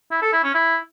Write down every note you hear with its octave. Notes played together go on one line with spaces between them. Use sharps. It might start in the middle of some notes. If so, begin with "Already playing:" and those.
E4
A4
E4
C#4
E4